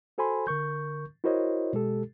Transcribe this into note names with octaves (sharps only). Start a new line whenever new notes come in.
F#4 A4 C5 G#5 B5 C6
D3 A#4 C#6 G6
E4 F#4 A#4 C5 C#5 D#5
B2 G#3 G4 A4